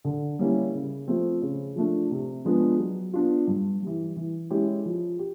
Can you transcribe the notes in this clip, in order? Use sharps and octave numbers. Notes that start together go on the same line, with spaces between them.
D3
G3 A#3 C#4 E4
C#3
F3 A3 C4
C#3
F3 A3 D4
C3
F3 G#3 B3 D4
F#3
B3 D4 F4
G2
E3 G3
E3
G#3 C#4 E4 G4
F3
G4